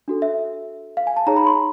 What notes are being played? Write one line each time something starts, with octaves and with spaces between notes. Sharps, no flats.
D4 F#4 A4
E5
F5
G#5
A5
D#4 G#4 C#5 A#5
B5
C6